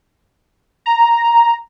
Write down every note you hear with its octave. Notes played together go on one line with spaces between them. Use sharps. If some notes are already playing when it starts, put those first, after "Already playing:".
A#5